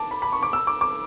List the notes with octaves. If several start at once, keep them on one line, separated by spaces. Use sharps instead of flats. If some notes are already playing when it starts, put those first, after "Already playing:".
Already playing: A5 D6
B5
B5
C#6
D6
E6
D6
D6